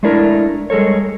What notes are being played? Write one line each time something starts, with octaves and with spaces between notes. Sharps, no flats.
G#3 A3 D4 E4 A#4
G3 G#3 A4 A#4 C#5